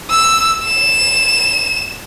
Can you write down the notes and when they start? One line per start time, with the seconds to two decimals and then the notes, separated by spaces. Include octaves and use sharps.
0.11 E6
0.64 E7